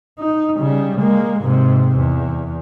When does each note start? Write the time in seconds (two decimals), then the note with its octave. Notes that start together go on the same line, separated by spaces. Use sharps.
0.19 D#4
0.58 C#3 G3
1.00 G#3 A#3
1.41 G#2 C3
1.96 E2